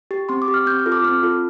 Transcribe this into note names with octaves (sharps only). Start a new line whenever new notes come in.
G4
C4 C6
D6
G4
F6
C4 G6
F6
F4 A4
D6
C4 F6
F4 A4